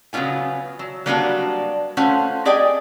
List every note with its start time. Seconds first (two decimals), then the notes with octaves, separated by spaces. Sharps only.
0.13 C#3 F#3 B3 D4 F4 G#5
0.79 F#3
1.06 F#3 G3 A#3 B3 D4 F#4
1.97 A3 C#4 F4 C5 F#5
2.45 G4 G#4 D5 D#5 G5 G#5